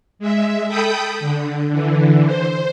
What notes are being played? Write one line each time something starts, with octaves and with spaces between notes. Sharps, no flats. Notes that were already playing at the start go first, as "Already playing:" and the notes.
G#3 E5
A4 G5 B5 D#6 G6
D3
D3 E3
C5